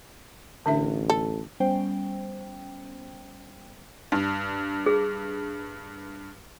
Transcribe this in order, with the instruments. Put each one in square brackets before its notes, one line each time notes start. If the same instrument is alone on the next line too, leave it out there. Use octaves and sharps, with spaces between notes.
[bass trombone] A1 [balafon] D3 D4 E5
[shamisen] A4
[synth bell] G3 B3 C#4 C5 G5
[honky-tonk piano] G2
[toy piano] G#4